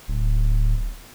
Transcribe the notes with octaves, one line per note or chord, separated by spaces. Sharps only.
D1